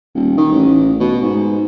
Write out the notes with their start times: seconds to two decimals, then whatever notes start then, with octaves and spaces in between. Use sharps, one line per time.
0.15 D#1
0.37 D#3
0.52 A1
1.00 B2
1.22 G#2